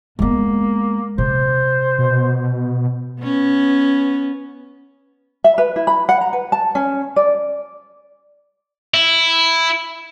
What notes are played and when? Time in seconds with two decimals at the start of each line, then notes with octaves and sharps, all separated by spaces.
0.19 G#3 A#3 B3
1.18 C3 C5
1.99 B2
3.21 B3 C#4
5.44 E5
5.58 B4
5.76 E4
5.87 B5
6.09 F#5
6.21 A#5
6.33 B4
6.52 A5
6.75 C#4
7.16 D5
8.94 E4